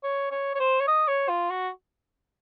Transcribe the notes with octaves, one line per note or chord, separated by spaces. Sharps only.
C#5
C#5
C#5
C5
C#5
D#5
C#5
F4
F#4